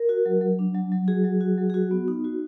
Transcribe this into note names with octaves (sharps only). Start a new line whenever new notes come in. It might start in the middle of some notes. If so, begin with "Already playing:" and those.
Already playing: A#4
F#4
F#3
F#3
D4
F#3
F#3
F#4 G#4
F#3
F#4
F#3
G#4
F#4
B3
D#4
F#4